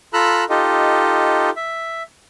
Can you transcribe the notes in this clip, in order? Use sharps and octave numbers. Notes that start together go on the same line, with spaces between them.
F4 A4 A#5 B5 E6 F#6
D#4 F4 G4 A4 D#5
E5